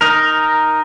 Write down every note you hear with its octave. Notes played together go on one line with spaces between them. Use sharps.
D#4 A#4